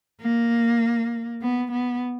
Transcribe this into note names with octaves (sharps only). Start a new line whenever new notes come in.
A#3
B3
B3